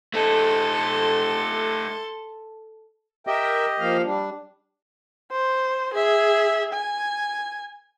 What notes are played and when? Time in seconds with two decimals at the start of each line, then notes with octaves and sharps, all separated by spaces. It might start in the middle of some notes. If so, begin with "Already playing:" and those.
0.14 A3 D#4 A4 C6
3.27 G4 A#4 D#5 E5 G5
3.79 F3 A#3 F5
4.03 G3 D4
5.31 C5
5.94 G#4 E5
6.73 G#5